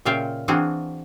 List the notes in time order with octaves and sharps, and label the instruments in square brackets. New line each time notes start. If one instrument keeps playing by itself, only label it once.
[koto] A#2 C#3 F4 E5 F5 G5
E3 C4 D4 F4 F#4 G#4